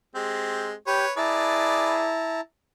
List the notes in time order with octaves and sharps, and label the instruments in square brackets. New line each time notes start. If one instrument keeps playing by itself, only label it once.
[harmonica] G#3 C4 G4
[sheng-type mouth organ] G4 [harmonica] B4 C#5
[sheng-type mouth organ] E4 A5 A#5 [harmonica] G#4 B4 D5